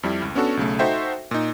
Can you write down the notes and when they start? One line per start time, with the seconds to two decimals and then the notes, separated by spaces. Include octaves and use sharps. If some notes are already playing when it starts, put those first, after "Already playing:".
0.03 F2 G3 E4
0.22 C#2
0.35 B3 C#4 D4 F#4 A4
0.57 B1 C#3 A3
0.79 D#4 F#4 A4 C5 E5 G5
1.31 A#2 D#4